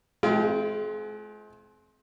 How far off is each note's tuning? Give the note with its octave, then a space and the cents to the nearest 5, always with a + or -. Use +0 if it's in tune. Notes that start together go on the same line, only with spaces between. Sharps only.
G#3 +40 C4 +0 F4 -25